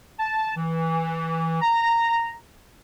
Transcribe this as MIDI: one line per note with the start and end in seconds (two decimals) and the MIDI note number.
0.19 0.56 81
0.57 1.57 52
1.62 2.35 82